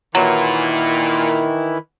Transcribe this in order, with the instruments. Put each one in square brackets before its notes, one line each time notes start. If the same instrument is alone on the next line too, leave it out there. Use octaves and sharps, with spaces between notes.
[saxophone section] A#2 [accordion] D#3 E3 E4 [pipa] F#3